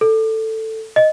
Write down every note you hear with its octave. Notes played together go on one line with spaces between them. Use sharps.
A4
D#5